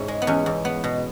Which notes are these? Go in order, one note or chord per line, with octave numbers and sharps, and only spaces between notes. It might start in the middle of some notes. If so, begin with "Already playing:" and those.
Already playing: G#2 C#4 E4
G#3
B3
E2 C#4
E2
B3
B2